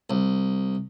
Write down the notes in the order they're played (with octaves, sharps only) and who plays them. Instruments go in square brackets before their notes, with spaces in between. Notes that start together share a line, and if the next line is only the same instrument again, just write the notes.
[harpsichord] C2